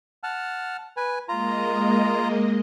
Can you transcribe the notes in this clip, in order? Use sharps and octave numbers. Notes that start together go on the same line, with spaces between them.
F#5 A5 F6
B4 G#5
G#3 A#3 F4 D#5 A#5